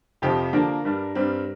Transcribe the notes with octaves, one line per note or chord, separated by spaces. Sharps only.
F2 C3 F3 G4
D3 F3 A#3 D4 A#4
G2 G3 D4
G2 G3 C4